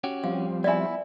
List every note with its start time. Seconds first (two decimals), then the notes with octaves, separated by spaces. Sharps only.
0.04 C#4 F#4 G4
0.24 F3 G3 C4 F5
0.64 B3 E4 D5 E5 G#5